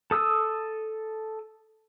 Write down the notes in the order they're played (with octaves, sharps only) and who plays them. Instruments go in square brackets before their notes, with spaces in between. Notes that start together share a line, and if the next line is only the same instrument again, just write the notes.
[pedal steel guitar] A4 D#6 E6